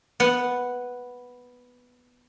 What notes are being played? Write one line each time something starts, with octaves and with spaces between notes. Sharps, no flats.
B3 F#5